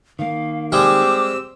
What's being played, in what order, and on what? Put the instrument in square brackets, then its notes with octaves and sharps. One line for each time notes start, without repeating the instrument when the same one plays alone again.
[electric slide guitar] D#3 A#3 [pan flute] F5
[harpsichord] G3 G#3 [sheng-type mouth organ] C4 G4 E6 [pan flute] D6